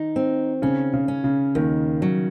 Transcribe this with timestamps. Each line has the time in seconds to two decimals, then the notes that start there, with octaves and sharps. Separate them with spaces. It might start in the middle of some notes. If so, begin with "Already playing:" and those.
Already playing: D#3 D#4
0.16 C4
0.62 C#3 C#4
0.94 C#3
1.08 C#4
1.24 C#3
1.55 D#2 D#3
2.02 F#3